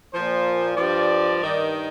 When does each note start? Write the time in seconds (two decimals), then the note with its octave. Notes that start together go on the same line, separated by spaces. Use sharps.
0.14 A#2 F3 C5
0.77 G2 F3 D5
1.40 G2 D#3